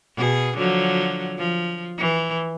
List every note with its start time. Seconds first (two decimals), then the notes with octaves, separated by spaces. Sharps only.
0.16 B2 G#4
0.56 D3 F3 F#3
1.38 F3
1.97 E3